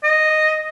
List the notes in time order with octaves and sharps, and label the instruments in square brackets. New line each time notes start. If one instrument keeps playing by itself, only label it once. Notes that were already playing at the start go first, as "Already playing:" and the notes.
[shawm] D#5